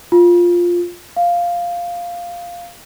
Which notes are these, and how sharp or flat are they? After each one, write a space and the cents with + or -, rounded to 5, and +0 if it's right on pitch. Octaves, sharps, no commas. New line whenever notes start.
F4 +5
F5 +0